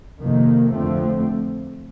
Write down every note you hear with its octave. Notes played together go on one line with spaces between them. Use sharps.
F2 C3 D#3 A#3
F2 D3 F3 A3 C4